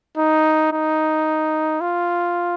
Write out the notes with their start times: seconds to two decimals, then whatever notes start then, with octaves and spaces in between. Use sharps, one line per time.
0.18 D#4
0.72 D#4
1.81 F4